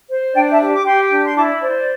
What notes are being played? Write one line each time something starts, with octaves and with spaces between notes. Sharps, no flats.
C5
D4 D5 G5
E5 A5
G4
D6
G4 G5 C6
D4
C6
E4 A5 D6
C5 D5
D5